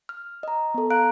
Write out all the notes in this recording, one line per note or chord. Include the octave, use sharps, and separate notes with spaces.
F6
D#5 A#5
B3 A4
F5 A#5 F#6 D7